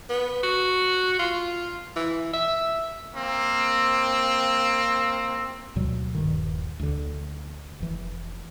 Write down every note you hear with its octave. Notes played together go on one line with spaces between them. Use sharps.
B3
F#4
F4
E3
E5
A#3 C4
D2 B2 F#3 G3
D#1 G2 D#3
D2 D3
F1 E3